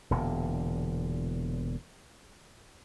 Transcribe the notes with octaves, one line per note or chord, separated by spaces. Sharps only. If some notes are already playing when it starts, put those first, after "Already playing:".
E1 E2 A#2 D3